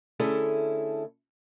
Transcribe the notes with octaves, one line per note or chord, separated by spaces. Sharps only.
D3 A3 C#4 E4 G#4 A4